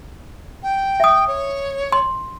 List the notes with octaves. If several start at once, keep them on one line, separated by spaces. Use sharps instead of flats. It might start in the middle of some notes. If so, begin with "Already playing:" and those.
G5
E5 D#6
C#5
C6